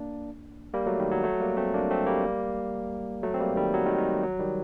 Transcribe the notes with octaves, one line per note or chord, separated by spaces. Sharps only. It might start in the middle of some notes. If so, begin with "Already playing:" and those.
Already playing: A#3 D4
G3 A#3
F#3 A3
D#3 G3
F#3
F#3 A3
G3 A#3
A3 C4
A#3 D4
A3 C4
G3 A#3
F#3 A3
C4
G3 A#3
D#3 G3
F#3
D#3 G3
D#3
F#3
D#3 G3